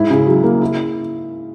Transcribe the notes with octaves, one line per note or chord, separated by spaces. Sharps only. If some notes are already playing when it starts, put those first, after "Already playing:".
Already playing: G#2 E4
C#3
F#3
A#3
E4